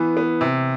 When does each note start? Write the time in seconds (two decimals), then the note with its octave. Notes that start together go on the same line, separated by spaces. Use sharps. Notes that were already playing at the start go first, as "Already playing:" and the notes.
Already playing: E3 B3
0.17 B3
0.41 C3